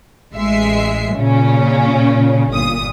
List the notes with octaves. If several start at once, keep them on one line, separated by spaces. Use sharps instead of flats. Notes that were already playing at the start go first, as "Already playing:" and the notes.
A1 G#3 E5 C7
A#2 C#3 C#4
G1 A#2 D#6